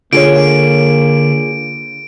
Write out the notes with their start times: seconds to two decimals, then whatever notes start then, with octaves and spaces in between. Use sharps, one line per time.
0.13 D3 A#3 F4 G#4 C#5 D7